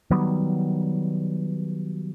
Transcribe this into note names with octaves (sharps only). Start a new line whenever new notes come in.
D#3 F#3 G3 B3